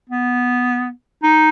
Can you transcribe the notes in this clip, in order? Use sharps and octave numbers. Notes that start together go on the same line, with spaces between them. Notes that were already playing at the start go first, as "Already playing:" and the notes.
B3
D#4